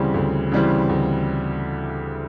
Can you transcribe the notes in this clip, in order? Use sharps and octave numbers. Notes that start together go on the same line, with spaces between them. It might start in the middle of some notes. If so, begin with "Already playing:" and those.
Already playing: D2 C#3 E3 G3 C4
D2
C#3 E3 G3 C4
D2